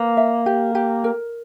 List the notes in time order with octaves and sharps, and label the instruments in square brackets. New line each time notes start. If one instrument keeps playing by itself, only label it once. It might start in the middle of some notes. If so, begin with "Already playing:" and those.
Already playing: [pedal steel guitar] A#3 [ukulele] B4
[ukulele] E5
G4
G4
A#4